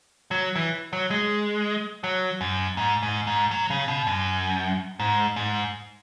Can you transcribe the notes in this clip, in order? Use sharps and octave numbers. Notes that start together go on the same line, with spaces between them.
F#3
E3
F#3
G#3
F#3
F#2
G#2
G#2
G#2
F#3
C#3
B2
F#2
G#2
G#2